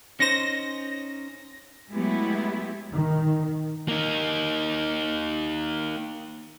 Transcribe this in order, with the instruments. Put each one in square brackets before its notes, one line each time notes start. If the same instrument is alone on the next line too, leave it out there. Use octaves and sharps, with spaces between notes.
[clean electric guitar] C#4 D#4 C5 [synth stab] A#6
[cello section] F#3 G#3 A3 B3 E4 G4
[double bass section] D#3
[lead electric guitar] A#3 D#4